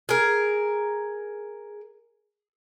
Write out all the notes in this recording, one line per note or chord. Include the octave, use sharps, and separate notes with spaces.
G#4 A#4